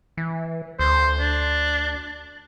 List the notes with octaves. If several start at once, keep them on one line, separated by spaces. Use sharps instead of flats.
E3
D2 C5
D4